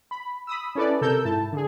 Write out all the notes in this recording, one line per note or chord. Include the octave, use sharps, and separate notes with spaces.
B5
B5 D#6 E6
C#4 E4 A4 B4 D5
C3 A4 A#4 E6 G6
G#2 E4 A5
D3 G#4